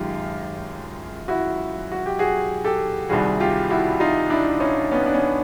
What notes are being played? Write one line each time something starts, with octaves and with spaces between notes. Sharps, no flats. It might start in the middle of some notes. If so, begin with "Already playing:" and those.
Already playing: F#2 D#3 G#3 F4 G4
E4 F#4
F#4
G4
F#4 G#4
G4 A4
C2 C3 D#3 G3 F#4 G#4
F4 G4
E4 F#4
D#4 F4
D4 E4
C#4 D#4
B3 C#4
D4
B3 C#4